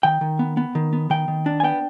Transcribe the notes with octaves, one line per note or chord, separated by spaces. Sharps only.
D#3 G5
D#3
B3
B3
D#3
B3
D#3 G5
D#3
D4
G#5
B3 G5